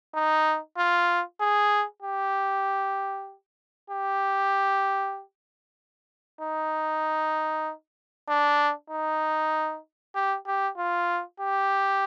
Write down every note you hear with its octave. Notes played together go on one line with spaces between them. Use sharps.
D#4
F4
G#4
G4
G4
D#4
D4
D#4
G4
G4
F4
G4